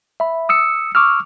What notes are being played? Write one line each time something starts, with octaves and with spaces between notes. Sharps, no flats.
E5 B5
D#6 E6 C#7
C#6 D6 E6 F6